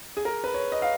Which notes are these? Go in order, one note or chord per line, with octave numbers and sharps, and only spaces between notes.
G#4
A#4
B4
C#5
D#5
F5